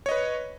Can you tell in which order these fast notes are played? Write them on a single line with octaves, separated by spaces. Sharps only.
C#5 D#5 B4